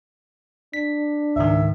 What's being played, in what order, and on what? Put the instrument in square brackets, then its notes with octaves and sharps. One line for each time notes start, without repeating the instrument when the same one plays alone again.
[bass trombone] D4 [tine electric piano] B6
[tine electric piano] C#2 G#2 D#3 [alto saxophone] E5